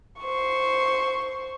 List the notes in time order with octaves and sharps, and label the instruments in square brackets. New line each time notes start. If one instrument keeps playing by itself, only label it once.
[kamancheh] C5 C#6